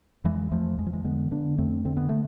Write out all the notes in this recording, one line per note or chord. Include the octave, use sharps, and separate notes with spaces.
F2 E3 G#3
F2 F3 A3
F2 G#3
F3
E3 G#3
D3 G#3 B3
D3 B3 D4
F2 A3 C4
D3 C4
B3
D3 A3